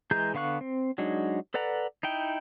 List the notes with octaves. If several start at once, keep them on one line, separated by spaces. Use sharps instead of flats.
E3 G#3 G#4 A#5 G6
D3 B3 F5 C#6 F#6
C4
F#3 G#3 D4 D#4 F#4
A4 B4 D5 F#5 A#5
D#4 E4 G5